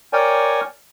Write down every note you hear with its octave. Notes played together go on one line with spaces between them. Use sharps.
A#4 C#5 D5 G5 G#5